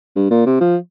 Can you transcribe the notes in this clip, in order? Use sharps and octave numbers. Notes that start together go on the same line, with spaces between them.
G2
A#2
C3
F3